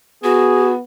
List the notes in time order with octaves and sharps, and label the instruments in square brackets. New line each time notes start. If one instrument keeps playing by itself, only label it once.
[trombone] B3 [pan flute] F#4 [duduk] G#4